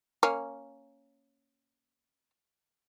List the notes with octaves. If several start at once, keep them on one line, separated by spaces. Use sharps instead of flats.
A#3 C#4